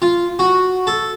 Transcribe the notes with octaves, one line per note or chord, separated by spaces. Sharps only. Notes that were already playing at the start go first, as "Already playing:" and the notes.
F4
F#4
A4